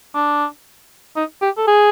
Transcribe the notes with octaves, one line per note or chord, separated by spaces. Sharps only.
D4
D#4
G4
A4
G#4